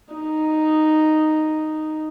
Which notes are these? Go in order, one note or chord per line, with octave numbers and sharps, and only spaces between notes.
D#4